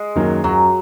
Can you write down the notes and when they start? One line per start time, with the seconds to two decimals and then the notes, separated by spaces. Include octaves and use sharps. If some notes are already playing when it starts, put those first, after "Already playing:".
Already playing: G#3
0.15 F#2 D#3 F#3 A#3
0.44 F#2 F#3